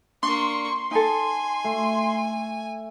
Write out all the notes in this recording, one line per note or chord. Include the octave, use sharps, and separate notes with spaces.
A#3 D4 C6 C#6
D#4 A4 G#5
A3